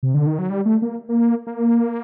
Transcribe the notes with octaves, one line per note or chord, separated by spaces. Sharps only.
C3
D3
D#3
F#3
G3
A3
A#3
A#3
A#3